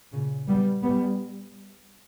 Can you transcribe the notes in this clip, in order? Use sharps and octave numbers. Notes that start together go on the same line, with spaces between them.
A#2 C#3
G3 B3
G3 B3